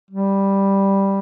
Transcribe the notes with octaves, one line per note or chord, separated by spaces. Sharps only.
G3